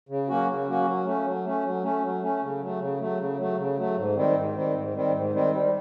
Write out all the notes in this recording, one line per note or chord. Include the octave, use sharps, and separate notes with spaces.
C#3
F#3 A#3 C#4 F#4
C#3
F#3 A#3 C#4 F#4
F#3
A3 C#4
F#3
A3 C#4
F#3
A3 C#4
F#3
A3 C#4
C#3
F#3 A3
C#3
F#3 A3
C#3
F#3 A3
C#3
F#3 A3
G#2
D#3 G3 C4
G#2
D#3 G3 C4
G#2
D#3 G3 C4
G#2
D#3 G3 C4
G3